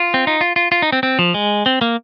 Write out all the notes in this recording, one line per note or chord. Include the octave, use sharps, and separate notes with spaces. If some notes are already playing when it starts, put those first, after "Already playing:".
Already playing: F4
C4
D#4
F4
F4
F4
D#4
C4
C4
F3
G#3
C4
A#3